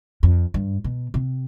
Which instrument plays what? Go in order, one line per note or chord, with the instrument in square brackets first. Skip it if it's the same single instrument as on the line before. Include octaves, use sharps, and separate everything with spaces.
[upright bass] F2
G2
B2
C3